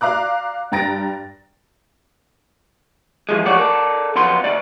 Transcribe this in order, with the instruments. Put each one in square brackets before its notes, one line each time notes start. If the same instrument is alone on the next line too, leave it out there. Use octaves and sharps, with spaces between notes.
[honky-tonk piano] D5 F5 A#5 D6 F#6
G2 G5 A#5 A6 A#6 D7
[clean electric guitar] E3 F3 G#3
F3 G3 A3 F#4 C#5 D5
A4 A#4 D5
F2 F#3 B3 C6
D2 D5